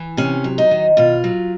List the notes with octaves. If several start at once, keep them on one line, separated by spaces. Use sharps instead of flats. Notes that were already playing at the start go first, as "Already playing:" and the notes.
Already playing: E3
C3 C#4
F#3
D#4
D#3
B2 F4
F#3